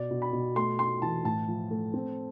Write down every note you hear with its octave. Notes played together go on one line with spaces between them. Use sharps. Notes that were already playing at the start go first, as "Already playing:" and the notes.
Already playing: B2 D5
B2
B5
B2
A3 C6
A3 C6
E3 A5
A2 A5
F3
A3
C4